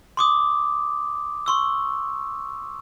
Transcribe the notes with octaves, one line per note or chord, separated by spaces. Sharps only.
C6 D6 D#6
C6 C#6 E6